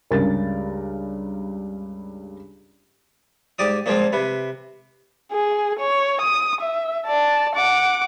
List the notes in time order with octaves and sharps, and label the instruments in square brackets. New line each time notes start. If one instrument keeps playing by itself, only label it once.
[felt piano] C#2 G2 A#4 A6
[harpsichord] G#2 G4 D5 D#6
A#2 F3 G#3 C4
C3 B4
[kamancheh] G#4
C#5
D#6
E5
D5 A5
F#5 D6